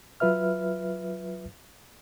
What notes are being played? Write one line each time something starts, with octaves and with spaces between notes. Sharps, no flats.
F#3 F4 B4 E5 F6